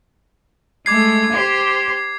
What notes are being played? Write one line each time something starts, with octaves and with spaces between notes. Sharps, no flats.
G#3 A3 D6 G#6 C7
G4 C5